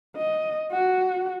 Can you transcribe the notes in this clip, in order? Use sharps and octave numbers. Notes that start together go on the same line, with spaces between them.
D#5
F#4